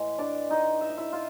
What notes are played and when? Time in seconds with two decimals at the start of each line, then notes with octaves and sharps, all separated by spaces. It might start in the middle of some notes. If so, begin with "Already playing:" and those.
Already playing: A2 E3 G#3
0.19 D4 D5
0.50 D#4 D#5
0.81 E5
0.89 D#5
0.98 E4 E5
1.12 F4 F5